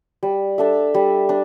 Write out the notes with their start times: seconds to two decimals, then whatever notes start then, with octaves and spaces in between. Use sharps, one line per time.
0.23 G3
0.58 D4 A4 E5
0.94 G3
1.29 D4